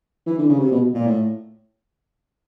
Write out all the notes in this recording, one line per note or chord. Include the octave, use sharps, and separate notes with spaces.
E3
D3
C#3
C3
B2
A#2
A2